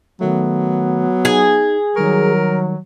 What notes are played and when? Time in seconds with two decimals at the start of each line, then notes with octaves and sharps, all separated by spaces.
0.21 D#3 F#3 A3 B3
1.25 D#4 G#4
1.96 D#3 F#3 G3 A#4 C#6